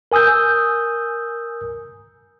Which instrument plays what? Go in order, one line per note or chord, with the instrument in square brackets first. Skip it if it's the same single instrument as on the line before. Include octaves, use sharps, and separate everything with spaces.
[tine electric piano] A#4 G#5 D#6 E6 G6